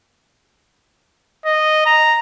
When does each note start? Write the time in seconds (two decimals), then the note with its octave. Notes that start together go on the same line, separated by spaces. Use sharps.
1.46 D#5
1.86 A#5